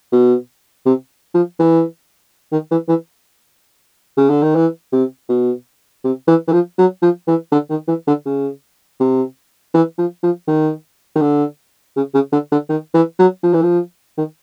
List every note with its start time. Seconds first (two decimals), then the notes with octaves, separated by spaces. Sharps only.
0.12 B2
0.86 C3
1.35 F3
1.59 E3
2.52 D#3
2.71 E3
2.89 E3
4.17 C#3
4.30 D3
4.43 D#3
4.55 E3
4.93 C3
5.29 B2
6.04 C3
6.28 E3
6.48 E3
6.53 F3
6.78 F#3
7.02 F3
7.28 E3
7.52 D3
7.70 D#3
7.88 E3
8.07 D3
8.26 C#3
9.00 C3
9.74 E3
9.98 F3
10.23 F3
10.48 D#3
11.16 D#3
11.22 D3
11.96 C#3
12.14 C#3
12.32 D3
12.52 D3
12.69 D#3
12.94 E3
13.19 F#3
13.43 F3
13.54 E3
13.62 F3
14.18 D#3